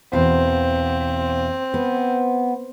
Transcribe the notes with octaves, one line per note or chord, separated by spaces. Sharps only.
E2 B2 C4 F5
B3